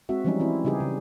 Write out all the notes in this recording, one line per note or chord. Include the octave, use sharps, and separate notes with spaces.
G#3 C4 F#4 E5
E3 F3 G3 G#3 C#4 D#4
E3 C4 E4
C#3 G3 D#4 G4 G#4
C#3